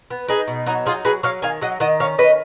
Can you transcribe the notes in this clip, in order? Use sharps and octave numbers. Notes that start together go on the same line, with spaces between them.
B3
D#4 G#4 B4
B2
F#3 D#4 F#4
D#4 F4 G#4
F#3 G#4 B4
F#3 C#5 F5
D#3 F5 G#5
F#3 D#5 F#5
D#3 D#5 F#5
C#4 C#5 F5
D#3 B4 D#5